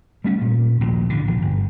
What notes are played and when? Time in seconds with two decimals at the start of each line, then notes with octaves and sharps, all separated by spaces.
0.24 G3 A3 C#4
0.41 A#2
0.81 A#1 D#2 A#2
1.10 A1 D3
1.27 A#1
1.42 G1